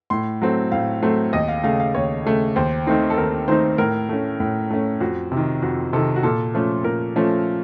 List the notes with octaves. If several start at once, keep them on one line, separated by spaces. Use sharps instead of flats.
A2 C6
F#3 A3 C4
A2 F5
F#3 A3 C4
D#2 D#5
F5
C#3 A3 F5
F5
D#2 C#5
C#3 A3
D#2 C5
D#3 A3 C4 D#4
A4
D#2 A#4
D#3 A3 C4 D#4 C5
A2 A#4
A3 C#4
A2
A3 C#4
F2 F#4
C3 D#3
F2 F#4
C3 D#3 A4
F#4
A#2 A4
F3 A3 C#4
A#2 A#4
F3 A3 C#4